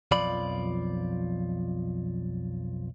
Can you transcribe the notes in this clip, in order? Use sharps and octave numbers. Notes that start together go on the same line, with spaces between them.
B1 F2 F3 F4 D5 B5